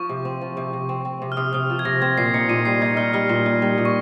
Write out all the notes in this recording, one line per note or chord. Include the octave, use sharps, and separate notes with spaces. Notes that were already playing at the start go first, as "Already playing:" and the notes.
Already playing: F3 C#6
C3
C4
F3
C3
C3
C4
C4
C3
F6
C3 D#6
C3 F6
F3
G#6
C3 A#6
C4 G#6
A#2 C7
D#4 C#7
A#2 D#7
G3 C7
D#4 G#6
D#4 F6
G3 F6
A#2
D#4
G3
A#2
C#6